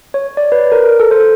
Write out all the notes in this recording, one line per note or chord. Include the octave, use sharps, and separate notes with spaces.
C#5
D5
B4
A#4
A4
C5